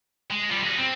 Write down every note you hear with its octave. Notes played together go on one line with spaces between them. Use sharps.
G#3
G3 F4
F#4 G#4
C4